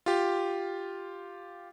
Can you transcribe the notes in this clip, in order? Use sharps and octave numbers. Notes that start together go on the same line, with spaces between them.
F4 G4